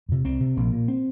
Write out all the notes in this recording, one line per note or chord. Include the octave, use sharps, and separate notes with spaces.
F2 C3
C2 C4
C3
A#1 A#3
A#2
C4